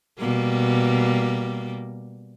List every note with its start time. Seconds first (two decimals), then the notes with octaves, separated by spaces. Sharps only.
0.19 B2 G3 A#3